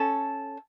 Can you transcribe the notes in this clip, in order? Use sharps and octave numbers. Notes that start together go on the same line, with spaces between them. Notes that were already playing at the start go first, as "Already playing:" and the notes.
Already playing: C#4 A4